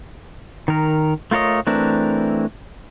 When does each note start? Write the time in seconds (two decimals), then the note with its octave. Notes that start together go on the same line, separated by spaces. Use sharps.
0.68 D#3 A#4
1.31 A3 F4 A#4 C#5 D#5
1.67 E3 A3 C4 D4 A#4